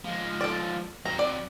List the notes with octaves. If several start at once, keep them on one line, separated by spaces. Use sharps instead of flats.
F3 G#3
A4 D5
F#3 C4 A#5
D5